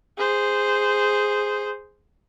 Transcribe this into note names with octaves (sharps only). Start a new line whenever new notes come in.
G#4 C5